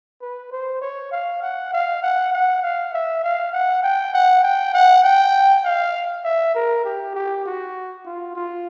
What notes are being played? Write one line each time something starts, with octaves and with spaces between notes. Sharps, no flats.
B4
C5
C#5
F5
F#5
F5
F#5
F#5
F5
E5
F5
F#5
G5
F#5
G5
F#5
G5
F5
E5
A#4
G4
G4
F#4
F4
F4